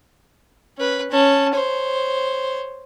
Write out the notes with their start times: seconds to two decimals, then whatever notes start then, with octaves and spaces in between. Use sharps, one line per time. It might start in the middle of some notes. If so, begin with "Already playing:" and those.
0.78 C#4 B4
1.10 C#4 A5
1.53 C5 C#5